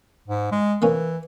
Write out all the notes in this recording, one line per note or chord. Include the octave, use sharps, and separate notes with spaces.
G#2
G#3
E3 A#3 C#4